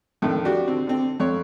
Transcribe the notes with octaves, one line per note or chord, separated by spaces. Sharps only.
F2 A2 D3 D#3
D4 F#4 G4
D3 C4
D3 C4
F2 C#5